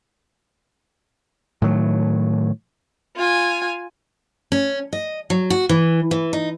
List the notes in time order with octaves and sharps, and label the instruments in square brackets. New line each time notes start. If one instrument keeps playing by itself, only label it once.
[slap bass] A2 D#3 F#3
[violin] F4 G#5
[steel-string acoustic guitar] C#4
D#5
F#3
F#4
E3
E3
D#4